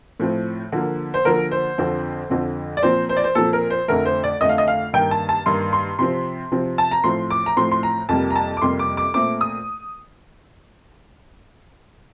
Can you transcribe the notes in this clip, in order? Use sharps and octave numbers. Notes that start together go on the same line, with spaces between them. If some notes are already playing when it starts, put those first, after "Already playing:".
A2 F3 C4
D3 F3 A#3
C5
D3 F3 A#3 A#4
C5
F2 D3 F3 C4
F2 D3 F3 C4
D5
A#2 F3 C4 C5
C5
D5
C5
A#2 F3 C4 A4
A#4
C5
F2 D3 A3 A#4
C5
D5
F2 D3 A3 D#5
F5
D#5
F5
G2 D#3 A#3 G5
A5
A5
G2 D#3 A#3 C6
C6
C3 F3 C4 C6
C3 F3 C4
A5
A#5
A2 F3 C4 C6
D6
A#5
A2 F3 C4 C6
C6
A#5
F2 C3 G3 A#3 A5
A#5
A5
D6
F2 C3 G3 A#3 C6
D6
D6
A#2 A3 C4 D6
D#6